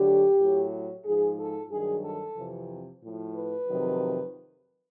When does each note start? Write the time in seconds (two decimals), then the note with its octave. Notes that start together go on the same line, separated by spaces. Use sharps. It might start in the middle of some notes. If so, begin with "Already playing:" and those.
Already playing: D2 D3 F#3 G4
0.38 A2 F#3
1.04 G#2 F3 G#4
1.38 A4
1.69 G2 D#3 F#3 G#4
2.03 A4
2.36 F2 C3 E3
3.02 A2 F3
3.35 B4
3.67 F2 C3 D#3 F#3